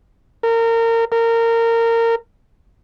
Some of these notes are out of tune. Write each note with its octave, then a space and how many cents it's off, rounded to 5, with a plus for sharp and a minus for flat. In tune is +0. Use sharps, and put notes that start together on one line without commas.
A#4 -25
A#4 -20